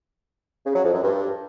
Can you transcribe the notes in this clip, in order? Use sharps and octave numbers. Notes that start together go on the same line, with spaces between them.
C#3
F#3
F2
F#2
G2